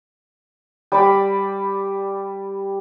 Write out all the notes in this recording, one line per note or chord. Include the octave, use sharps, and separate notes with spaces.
G3 D5 B5